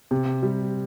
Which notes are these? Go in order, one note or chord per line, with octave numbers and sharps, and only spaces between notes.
C3
G3